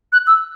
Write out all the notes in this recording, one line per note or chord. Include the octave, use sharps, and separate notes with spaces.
F#6
E6